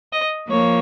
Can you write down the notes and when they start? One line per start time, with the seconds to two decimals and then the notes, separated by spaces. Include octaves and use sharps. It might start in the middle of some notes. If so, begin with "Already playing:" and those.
0.12 D#5
0.49 F3 A#3 C#5